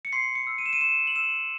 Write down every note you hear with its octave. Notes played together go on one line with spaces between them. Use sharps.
C#7
C6 C7
C#7
E6
D#7
E7
D#7
C6 E7
F#7
E6 E7